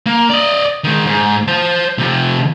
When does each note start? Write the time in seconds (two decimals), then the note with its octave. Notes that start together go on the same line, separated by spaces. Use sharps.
0.06 A#3
0.30 D5 D#5
0.84 D#3 G#3
1.06 G#2
1.48 C5 A5
1.98 C3 F3